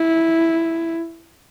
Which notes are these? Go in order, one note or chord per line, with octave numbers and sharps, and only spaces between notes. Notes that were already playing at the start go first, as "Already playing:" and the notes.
Already playing: E4